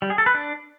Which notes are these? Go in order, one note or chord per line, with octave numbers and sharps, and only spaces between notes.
G3
G#4
A4
B4
D4